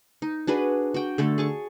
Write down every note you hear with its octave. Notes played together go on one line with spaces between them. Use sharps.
D#4
D4 F#4 G#4 B4
F#4 G5
D3 A3 A4
G#4 A5 C#6